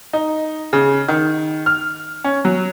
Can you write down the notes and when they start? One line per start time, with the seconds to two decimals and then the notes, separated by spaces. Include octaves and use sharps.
0.13 D#4
0.73 C#3
1.09 D#3
1.66 F6
2.24 C#4
2.45 F#3